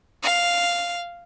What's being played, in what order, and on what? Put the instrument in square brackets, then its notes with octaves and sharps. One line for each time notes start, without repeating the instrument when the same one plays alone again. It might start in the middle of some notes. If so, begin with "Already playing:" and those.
[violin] F5